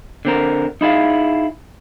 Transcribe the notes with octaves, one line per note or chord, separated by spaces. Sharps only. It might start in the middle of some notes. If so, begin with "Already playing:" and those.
D3 C4 A#4
D#4 E4 G#4 F5